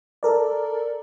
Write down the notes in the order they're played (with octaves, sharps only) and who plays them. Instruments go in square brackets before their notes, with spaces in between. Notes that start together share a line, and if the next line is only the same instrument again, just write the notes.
[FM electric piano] A4 A#4 D5